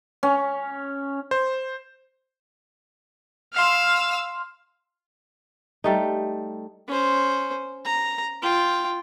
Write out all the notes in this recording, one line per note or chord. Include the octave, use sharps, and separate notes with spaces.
C#4
C5
F5 C6 E6 F6
G3 A3 D#4
C#4 C5
A#5
F4 G5